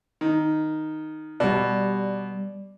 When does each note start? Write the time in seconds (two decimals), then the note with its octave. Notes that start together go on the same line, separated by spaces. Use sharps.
0.21 D#3
1.40 B2 G3 D5